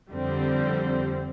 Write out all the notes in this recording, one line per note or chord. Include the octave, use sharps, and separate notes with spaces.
F2 D3 G3 C4